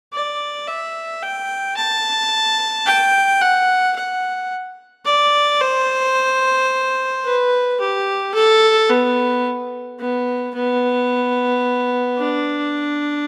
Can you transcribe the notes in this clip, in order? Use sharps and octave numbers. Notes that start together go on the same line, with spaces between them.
D5
E5
G5
A5
G5
F#5
F#5
D5
C5
B4
G4
A4
B3
B3
B3
D4